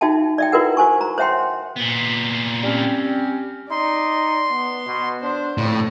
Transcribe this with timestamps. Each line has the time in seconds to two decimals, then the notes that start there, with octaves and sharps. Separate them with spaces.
0.01 D#4 F#4 E5 G5 A5
0.38 D5 E5 G5
0.52 E4 F#4 A#4 B4 F#5
0.77 F#4 C5 G#5 C#6
1.01 A#5
1.18 C5 C#5 E5 F#5 G5 C6
1.76 A#2 B3
2.64 G3 C4 C#4
3.71 D#4 D5 C6
4.50 B3
4.86 B2
5.22 D4 C5
5.58 F2 A2